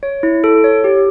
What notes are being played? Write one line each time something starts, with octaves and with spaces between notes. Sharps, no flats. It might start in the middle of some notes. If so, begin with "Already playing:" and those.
C#5
E4
A4
C#5
G4